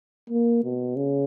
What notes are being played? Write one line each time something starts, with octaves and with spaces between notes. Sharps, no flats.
A#3
B2
C#3